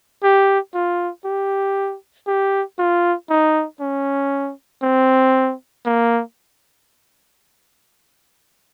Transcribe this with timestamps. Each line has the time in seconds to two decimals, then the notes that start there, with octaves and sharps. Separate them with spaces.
0.23 G4
0.74 F4
1.25 G4
2.27 G4
2.79 F4
3.30 D#4
3.80 C#4
4.82 C4
5.86 A#3